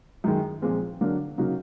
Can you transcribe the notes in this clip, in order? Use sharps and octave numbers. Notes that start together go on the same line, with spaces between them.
F#2 D#3 G#3
A#2 F3 G#3 C4
D3 F#3 A#3 D4
C#3 F#3 A#3 D#4 F#4